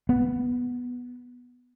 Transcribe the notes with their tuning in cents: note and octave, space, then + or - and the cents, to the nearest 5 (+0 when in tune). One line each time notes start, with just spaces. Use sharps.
B3 -5